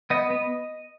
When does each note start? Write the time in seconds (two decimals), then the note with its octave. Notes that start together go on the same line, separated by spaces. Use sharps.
0.10 B3 D#5
0.30 B3